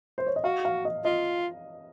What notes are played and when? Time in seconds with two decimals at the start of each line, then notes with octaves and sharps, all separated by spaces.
0.18 C5
0.26 C#5
0.36 D#5
0.44 F#4 F5
0.65 F5
0.85 D#5
1.05 F4 D#5